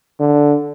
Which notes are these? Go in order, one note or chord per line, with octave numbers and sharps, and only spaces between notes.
D3